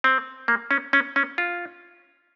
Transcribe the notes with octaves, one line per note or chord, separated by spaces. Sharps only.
C4
A#3
C#4
C#4
C#4
F4